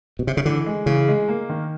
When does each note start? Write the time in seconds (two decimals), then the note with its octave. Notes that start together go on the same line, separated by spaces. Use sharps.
0.19 B2
0.27 C3
0.37 C#3
0.45 D3 E3
0.66 G#3
0.86 C#3 E3
1.08 G#3
1.29 A#3
1.49 D#3